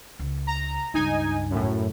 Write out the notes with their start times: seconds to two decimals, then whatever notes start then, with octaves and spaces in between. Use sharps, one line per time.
0.19 C#2
0.47 A#5
0.94 C#2 G2 D#4 G#5
1.50 F#2 A2